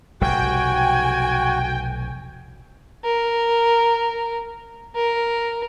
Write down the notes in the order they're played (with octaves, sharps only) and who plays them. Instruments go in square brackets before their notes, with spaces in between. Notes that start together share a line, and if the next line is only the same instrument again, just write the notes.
[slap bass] F1 B1 G3 [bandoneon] F#4 [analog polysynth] G5 [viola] G#5
[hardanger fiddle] A#4
A#4